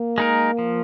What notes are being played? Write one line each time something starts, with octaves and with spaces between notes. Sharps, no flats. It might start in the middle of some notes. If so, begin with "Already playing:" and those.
Already playing: A#3
G#3 D#4 A#4
F3